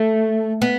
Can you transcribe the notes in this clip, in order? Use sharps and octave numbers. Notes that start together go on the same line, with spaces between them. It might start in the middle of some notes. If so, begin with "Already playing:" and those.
Already playing: A3
B3